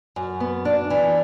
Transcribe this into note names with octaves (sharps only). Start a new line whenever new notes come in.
F#2
B3
D4
E3